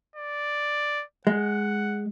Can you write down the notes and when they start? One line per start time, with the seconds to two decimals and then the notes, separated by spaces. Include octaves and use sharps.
0.16 D5
1.27 G#3 F#5